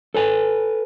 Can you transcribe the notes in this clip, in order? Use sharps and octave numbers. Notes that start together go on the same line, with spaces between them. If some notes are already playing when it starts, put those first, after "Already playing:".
A4 B4 G#5